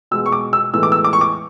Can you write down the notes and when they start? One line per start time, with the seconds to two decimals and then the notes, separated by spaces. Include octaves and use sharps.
0.11 B2 G#3 E6
0.26 C#6
0.32 D6
0.53 E6
0.74 A2 E3 G#3 E6
0.83 D6
0.92 E6
1.04 D6
1.13 C#6
1.21 D6